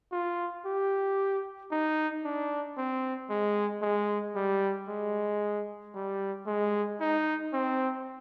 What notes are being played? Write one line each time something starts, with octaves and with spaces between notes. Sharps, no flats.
F4
G4
D#4
D4
C4
G#3
G#3
G3
G#3
G3
G#3
D#4
C4